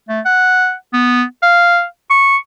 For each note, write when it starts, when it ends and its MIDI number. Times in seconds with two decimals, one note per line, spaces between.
0.09 0.20 57
0.25 0.74 78
0.93 1.23 59
1.42 1.84 77
2.10 2.37 85